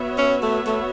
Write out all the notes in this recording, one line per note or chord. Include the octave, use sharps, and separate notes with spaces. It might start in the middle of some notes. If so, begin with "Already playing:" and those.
Already playing: B3 F#4 C#5 E5
C#4
A3
A3